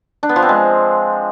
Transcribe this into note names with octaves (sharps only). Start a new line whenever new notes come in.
D4
B3
F3
C4
G#3